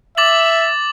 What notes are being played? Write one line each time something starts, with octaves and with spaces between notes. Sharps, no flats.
E5 D6 A6 F#7